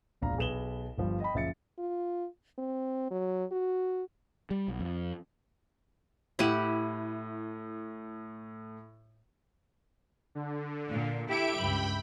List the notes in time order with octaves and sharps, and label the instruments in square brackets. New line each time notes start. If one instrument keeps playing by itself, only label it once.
[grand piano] E1 A#1 F5 A#5
B1 G#4 B4 E7 F#7 G7
G1 F3 G3
D#5 G5 B5
F#1 F3 E5 A6 C#7
[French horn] F4
C4
F#3
F#4
[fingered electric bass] G3
B1
F2
[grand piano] A2 D#7 [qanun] E4 G4 F#5
[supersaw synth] D3
[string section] A#2
[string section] E4 A4 [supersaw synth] G4 E5 D7
[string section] C#2 G2 [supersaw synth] G5 B5